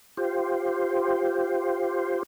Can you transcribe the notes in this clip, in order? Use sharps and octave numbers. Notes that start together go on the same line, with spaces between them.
F4 G4 C5